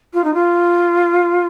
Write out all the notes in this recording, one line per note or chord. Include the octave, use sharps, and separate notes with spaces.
F4
D#4
F4